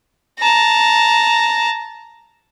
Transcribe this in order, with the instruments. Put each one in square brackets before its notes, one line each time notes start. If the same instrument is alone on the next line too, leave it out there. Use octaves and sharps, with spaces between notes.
[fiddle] A5 A#5